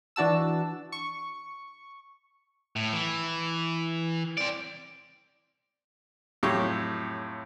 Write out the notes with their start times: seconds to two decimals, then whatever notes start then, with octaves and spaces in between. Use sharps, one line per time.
0.16 E3 D4 F#4 A5 E6
0.92 C#6
2.76 A2
2.92 E3
4.38 C4 D5
6.43 F2 A2 F#3 G4 C#6